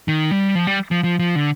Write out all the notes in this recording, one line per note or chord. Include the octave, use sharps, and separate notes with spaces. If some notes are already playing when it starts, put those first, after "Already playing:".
D#3
G3
F3
G3
F3
F3
F3
D3